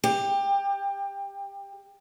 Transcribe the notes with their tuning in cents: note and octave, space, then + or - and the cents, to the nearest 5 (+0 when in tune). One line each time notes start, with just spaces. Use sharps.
G4 +20